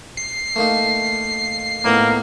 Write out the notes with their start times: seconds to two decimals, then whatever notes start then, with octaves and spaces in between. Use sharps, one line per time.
0.17 C7
0.56 A3 A#3 D#4
1.85 A2 A#3 B3 D#4